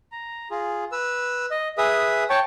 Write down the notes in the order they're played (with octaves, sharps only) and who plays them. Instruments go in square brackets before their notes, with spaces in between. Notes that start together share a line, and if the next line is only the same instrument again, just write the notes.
[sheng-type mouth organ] A#5
F4 G#4
B4 E6
D#5
G#4 B4 E5 D#6
C#5 G5 A5 C#6